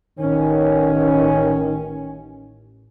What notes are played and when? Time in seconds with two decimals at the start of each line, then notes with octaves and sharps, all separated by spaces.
0.19 A1 D#3 C#4